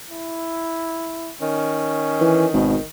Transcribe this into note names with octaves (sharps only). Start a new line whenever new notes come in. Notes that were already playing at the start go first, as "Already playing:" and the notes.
E4
D#3 C#4
E3
G#1 B2